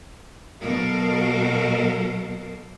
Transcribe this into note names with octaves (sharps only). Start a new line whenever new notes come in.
B2 F#3 F#4 A4 A#4 F5